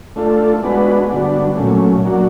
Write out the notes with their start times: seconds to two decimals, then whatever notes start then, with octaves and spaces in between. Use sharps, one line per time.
0.16 A3 D4 F4 A4
0.62 G#3 B3 D4 F#4 B4
1.09 D3 G3 B3 D4 F#4
1.56 A#2 F#3 A3 C#4
2.03 F#3 A#3 D4 F#4